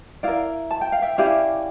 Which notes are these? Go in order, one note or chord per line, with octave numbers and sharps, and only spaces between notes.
E4 A#4 D5 F5
A5
G5
F5
E5 G5
C#4 E4 G4 D5 F5